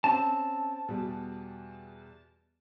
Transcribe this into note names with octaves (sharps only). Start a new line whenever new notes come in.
C4 C#4 A5
E2 B2 G3